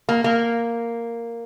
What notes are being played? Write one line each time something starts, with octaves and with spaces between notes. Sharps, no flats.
A#3
A#3